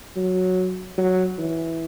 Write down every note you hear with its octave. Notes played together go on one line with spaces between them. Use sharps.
F#3
F#3
E3